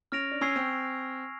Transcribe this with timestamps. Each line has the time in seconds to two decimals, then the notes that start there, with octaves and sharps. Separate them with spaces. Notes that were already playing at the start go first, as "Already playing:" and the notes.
0.12 C#4 F6 A#6 D7 F7
0.31 D4
0.41 C#4 G#5 C#6 E6 G#6 C7
0.56 C4